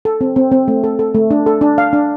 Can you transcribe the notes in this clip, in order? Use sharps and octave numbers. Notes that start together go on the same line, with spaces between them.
A4
C4
C4
C4
A3
A4
A4
A3
D4
A4
D4
F5
D4